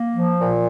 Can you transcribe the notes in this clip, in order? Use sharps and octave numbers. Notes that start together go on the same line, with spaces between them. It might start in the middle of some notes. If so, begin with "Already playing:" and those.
Already playing: A#3
F3
A#2